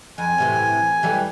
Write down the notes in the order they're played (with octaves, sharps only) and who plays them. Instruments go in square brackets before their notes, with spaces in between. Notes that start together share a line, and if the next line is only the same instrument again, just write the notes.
[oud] F2 [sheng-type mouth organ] G#5
[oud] A2 C3 E3
E3 G3 A3